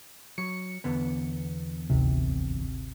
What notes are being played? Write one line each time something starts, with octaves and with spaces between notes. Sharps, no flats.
F#3 C#7
E2 D3 B3
G#1 D2 C3